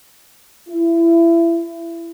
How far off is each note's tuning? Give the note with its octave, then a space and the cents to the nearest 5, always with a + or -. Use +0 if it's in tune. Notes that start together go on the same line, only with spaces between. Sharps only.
E4 +25